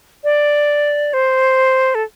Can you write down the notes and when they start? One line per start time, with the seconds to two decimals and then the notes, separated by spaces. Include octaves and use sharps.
0.24 D5
1.14 C5
1.95 A4